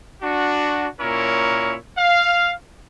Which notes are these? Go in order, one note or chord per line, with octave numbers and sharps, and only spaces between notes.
D4 F#4
A#2 C#4 E4 A#4 C#5
F5